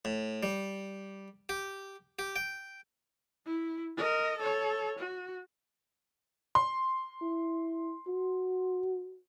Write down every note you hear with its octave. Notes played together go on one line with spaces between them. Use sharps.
A2
G3
G4
G4
G5
E4
A#4 D#5
A4 C#5
F#4
C6
E4
F#4